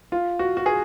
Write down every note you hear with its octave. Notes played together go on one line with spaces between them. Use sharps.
F4
F#4
F#4
G#4